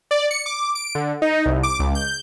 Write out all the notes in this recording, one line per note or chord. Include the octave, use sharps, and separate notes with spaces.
D5
C#7
D6
D7
D3
D#4
C2
D6
C#2
G6